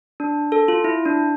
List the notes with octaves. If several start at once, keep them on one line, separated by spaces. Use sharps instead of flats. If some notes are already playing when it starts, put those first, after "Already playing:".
D4
A4
F4
E4
D4